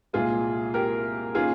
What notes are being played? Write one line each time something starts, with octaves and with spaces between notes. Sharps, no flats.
C2 A#2 G#3 F4 G#4
G4 A#4
D#3 A#3 C#4 F4 G#4